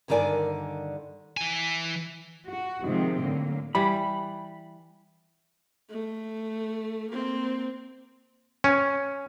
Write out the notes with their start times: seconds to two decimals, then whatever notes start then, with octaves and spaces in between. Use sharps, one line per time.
0.08 G2 D3 D#3 A#4 D5 G#5
1.37 E3 G#5
2.47 F#4
2.83 C3 D#3 F3 G#3 C4
3.19 A2 D3 F#3 A#3
3.75 E3 G3 B5
5.90 A3
7.12 A#3 C4
8.64 C#4